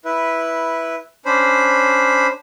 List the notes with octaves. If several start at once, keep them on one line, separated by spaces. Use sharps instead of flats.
E4 B4
C#4 D4 C5 B5